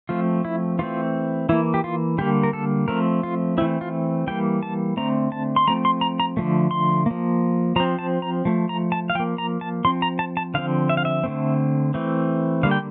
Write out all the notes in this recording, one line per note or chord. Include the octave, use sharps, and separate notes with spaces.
F3 A3 C4 F4
E4
E3 A3 C4 F4
E3 A#3 E4
G4
F4
D3 G3 A#3 G4
A#4
A4
F3 A3 C4 A#4
F4
E3 A3 C4 E4
F4
E3 G3 A#3 G5
A5
D3 A3 C4 A#5
A5
C6
F3 A3 C4 A#5
C6
A#5
A#5
D3 F3 A3
C6
F3 A#3
F3 C4 A#5
A5
A#5
F3 A3
A#5
A5
F5
F3 A#3 G5
A#5
A5
F3 C4 C6
A#5
A5
A5
D3 F3 C4 F5
E5
F5
E5
D3 A3 C4
E3 A3 C4
D3 G3 A#3 F5
G5